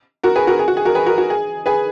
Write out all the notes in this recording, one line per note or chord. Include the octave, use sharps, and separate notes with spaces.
F#4 A#4
G#4 B4
F#4 A#4
G#4
F#4
G#4
F#4 A#4
G#4 B4
F#4 A#4
F#4
G#4
G#4 B4